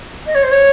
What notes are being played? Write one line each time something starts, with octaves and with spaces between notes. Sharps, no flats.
D#5
C#5
C5
C#5